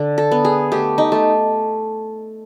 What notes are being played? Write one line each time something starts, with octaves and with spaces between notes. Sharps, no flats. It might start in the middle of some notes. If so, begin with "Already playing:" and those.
Already playing: D3
A4
B3
G#4
A3 G4
D#4
A3